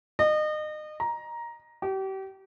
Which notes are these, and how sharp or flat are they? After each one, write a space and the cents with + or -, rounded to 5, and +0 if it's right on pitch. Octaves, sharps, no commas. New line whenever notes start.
D#5 -30
A#5 +10
G4 -35